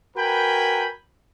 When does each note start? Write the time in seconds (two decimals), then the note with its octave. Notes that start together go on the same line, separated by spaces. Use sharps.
0.17 F#4 A#4 B4 G5 G#5 B5